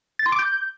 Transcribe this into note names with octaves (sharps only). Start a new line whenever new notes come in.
A6
C6
D6
G6